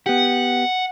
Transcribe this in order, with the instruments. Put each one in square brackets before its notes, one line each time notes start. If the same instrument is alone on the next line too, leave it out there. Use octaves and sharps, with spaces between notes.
[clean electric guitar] B3 G4 [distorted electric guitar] F#5